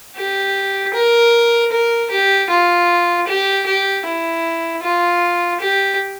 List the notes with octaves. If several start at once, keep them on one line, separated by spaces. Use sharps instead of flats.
G4
A#4
A#4
G4
F4
G4
G4
E4
F4
G4